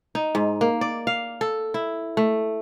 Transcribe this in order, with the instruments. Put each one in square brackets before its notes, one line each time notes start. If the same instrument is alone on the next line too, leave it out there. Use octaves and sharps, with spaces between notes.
[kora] D#4
G#2
A#3
D5
F5
A4
E4
A3